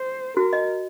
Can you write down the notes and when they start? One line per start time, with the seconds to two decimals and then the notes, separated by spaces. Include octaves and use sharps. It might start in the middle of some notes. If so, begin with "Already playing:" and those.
Already playing: C5
0.37 F#4 A#4
0.53 D#5